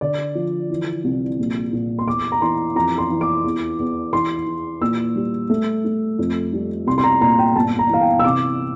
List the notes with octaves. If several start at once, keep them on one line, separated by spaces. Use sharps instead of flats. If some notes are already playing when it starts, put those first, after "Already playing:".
D3 D5
F3
E3
C2
A#1
A#2
C6
E2 D6
A#5
E3 C6
F2 A#5
C6
E3
D6
E2
E2
E3 C6
E3
A#2 E6
G3
A3
A3
F2
G3
C2 C6
C6
A#5
A#2 A#5
G5
G1 A5
A#5
E3 F5
G5
E6
C3 D6